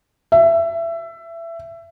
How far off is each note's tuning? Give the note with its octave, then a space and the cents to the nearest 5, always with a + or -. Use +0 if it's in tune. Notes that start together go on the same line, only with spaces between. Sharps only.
E5 +20